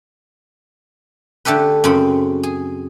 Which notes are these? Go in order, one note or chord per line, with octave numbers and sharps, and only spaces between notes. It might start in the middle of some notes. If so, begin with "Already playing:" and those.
D3 A3 G4 A4 B4
F#2 C#3 C4 B5
G#4